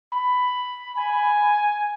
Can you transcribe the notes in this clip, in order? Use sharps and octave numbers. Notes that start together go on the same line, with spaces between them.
B5
G#5